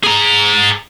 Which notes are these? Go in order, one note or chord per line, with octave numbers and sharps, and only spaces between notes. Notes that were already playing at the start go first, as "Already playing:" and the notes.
G#4 A#5